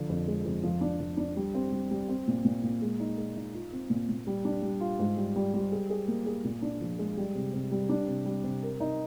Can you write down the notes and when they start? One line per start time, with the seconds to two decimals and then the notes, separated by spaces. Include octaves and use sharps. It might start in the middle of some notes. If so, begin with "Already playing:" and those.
Already playing: D3 F3
0.09 F2
0.28 G#3
0.45 F2
0.63 F3
0.81 D4
1.00 F3
1.18 D4
1.37 G3
1.54 C4
1.72 G3
1.91 G3
2.08 C4
2.28 A#2
2.45 A#2
2.63 A#2
2.82 G#3
3.00 D#4
3.18 G#3
3.36 D#4
3.54 F4
3.72 C4
3.90 A#2
4.09 A#2
4.27 G3
4.45 D4
4.62 G3
4.80 F4
4.99 G#2
5.17 G3
5.36 G3
5.54 G3
5.72 G#4
5.90 G#4
6.08 A#3
6.26 G#4
6.44 A#2
6.62 D4
6.81 F3
6.99 G#3
7.17 G3
7.35 C3
7.53 C3
7.72 G3
7.89 D4
8.07 C3
8.25 G3
8.44 C3
8.62 A#4
8.80 D#4